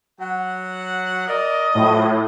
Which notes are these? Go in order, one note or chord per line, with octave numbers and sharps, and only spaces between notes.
F#3 F#5
A#4 D5 D#5
A2 F3 F#3